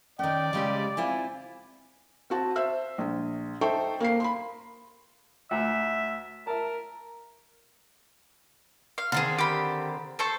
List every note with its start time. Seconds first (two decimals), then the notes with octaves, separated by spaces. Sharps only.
0.19 D#3 C#4 D5 G5
0.53 C#3 G3 G#3 G4
0.97 C4 E4 F4 G#5
2.30 C4 F#4 A5
2.56 C5 E5 E6
2.98 A#1
3.61 D#4 A4 C5 E5 G5 C#6
4.00 A#3 F5 C7
4.20 B5 C6
5.51 D2 E5 A#5
6.47 A#4 E5 A5
8.98 F5
9.12 D3 D#3 C4 G#4 F5
9.39 G4 B5
10.19 A4 C5 C#6